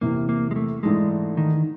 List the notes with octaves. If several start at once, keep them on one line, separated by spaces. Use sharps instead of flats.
E2 C3 E3 A#3
A#3
G#3
A3
G#2 E3 G#3 A3 D4
D#3